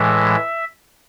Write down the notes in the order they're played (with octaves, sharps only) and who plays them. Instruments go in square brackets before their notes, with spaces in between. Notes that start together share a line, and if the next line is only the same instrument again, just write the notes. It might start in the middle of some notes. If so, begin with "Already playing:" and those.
Already playing: [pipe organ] A2 E3 G#3 E5